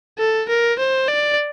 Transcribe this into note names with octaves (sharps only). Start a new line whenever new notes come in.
A4
A#4
C5
D5